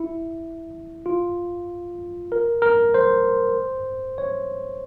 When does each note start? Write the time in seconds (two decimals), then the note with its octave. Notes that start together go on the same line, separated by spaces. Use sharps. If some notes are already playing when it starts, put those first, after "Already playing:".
Already playing: E4
1.06 F4
2.32 A#4
2.62 A#4
2.94 C5
4.18 C#5